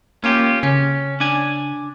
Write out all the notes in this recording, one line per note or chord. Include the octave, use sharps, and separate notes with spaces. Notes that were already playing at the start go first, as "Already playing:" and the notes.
A#3 C#4 F4 G4
C#3 C#4
D4 G#5